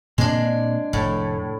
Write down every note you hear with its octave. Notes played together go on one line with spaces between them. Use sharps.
A#2 G#3 A#3 C4 D4
F1 A2